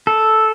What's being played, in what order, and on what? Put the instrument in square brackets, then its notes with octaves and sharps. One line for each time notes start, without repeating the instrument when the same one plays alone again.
[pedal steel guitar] A4